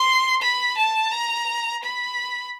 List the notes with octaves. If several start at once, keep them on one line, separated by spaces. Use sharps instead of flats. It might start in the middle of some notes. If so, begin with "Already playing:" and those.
Already playing: C6
B5
A5
A#5
B5